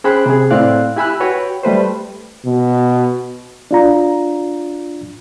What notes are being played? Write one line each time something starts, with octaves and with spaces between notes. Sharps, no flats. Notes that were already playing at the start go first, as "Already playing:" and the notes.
C#4 G#4 C5 G5 B5 F#6
C3 G#4
A2 C4 E4 D5 F5 F#6
E4 G4 G#5 B5 E6 F#6
F#4 B4 C#5 G5
G3 A3 B4 C5
B2
D4 F4 A#5